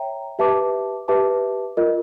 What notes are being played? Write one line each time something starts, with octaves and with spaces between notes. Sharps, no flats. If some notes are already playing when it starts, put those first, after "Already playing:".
Already playing: C#5 E5 G5 A#5
G4 B4 E5 A5 D6
G4 B4 E5 A5 D6
F4 A#4 D#5